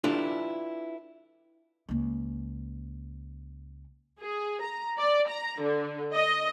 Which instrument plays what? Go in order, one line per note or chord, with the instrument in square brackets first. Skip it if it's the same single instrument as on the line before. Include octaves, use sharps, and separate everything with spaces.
[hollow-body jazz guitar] D4 E4 F4 G4 A4 B4
[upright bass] C#2 A#3
[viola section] G#4
A#5
D5
A#5
D3
D#5